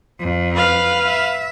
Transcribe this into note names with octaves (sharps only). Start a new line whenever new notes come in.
F2
B4 F5
E5